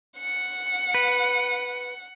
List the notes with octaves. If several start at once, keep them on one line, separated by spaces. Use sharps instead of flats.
F#5 C#7
B4